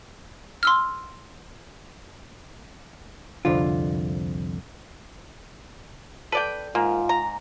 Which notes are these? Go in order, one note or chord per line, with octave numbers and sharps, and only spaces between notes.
C6 E6 F6
C2 F2 D3 F4
A4 B4 D5 G5
G#2 A#3 F4
A#5